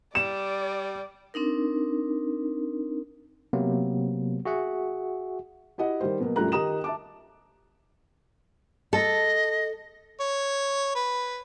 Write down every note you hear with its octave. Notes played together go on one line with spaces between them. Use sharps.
G3 D5 E7
C4 D4 D#4 A#4
C3 F#3 A#3 B3
F#4 G#4 E5 F#5
E4 G4 D#5 F#5
D#3 G3 C5
B2 F#3 A#3
A#1 F#2 G3 A3 A#5 F#6
D#3 D#4 G4 A#5 D#6 E7
E5 A5 D6
A4 D#5
C#5
B4